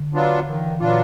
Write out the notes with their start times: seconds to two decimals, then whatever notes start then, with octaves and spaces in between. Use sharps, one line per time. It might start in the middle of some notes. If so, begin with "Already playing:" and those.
Already playing: D3
0.14 F#3 B3 D4 F4
0.47 D#3 E3
0.80 A#2 F#3 B3 D4 F4